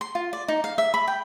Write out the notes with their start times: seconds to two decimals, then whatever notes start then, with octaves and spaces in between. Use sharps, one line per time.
0.01 C6
0.15 F4
0.33 D5
0.48 D#4
0.64 F5
0.78 E5
0.94 B5
1.08 G5